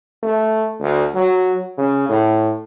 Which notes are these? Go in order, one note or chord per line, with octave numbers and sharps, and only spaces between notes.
A3
D2
F#3
C#3
A2